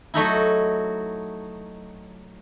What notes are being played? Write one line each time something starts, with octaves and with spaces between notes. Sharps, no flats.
F#3 A3 D#4 E4